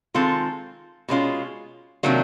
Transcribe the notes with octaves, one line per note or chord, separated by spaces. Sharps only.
D#3 G#3 C4 F4 A4
B2 G#3 C#4 F4
C3 D#3 F#3 A#3 D4